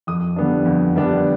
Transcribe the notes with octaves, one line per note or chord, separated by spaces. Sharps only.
F2 D#6
D3 G3 B3 D4
F2
D3 G3 B3 D4